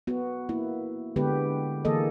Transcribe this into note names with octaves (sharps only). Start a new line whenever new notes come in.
B3 F#4
A#3 E4
D3 G#3 B3 G4 B4
D3 E3 A#3 G#4 A4 D#5